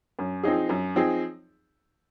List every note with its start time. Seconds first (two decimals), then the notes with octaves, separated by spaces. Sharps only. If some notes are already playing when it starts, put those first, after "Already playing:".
0.19 F#2
0.43 F3 C4 D#4 G#4
0.69 F#2
0.95 F3 C4 D#4 G#4